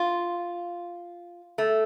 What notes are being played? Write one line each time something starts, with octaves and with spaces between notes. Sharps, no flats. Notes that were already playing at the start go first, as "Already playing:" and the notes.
Already playing: F4
A3